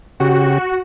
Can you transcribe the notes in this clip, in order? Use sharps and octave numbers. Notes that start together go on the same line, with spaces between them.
C#3 F#4 G4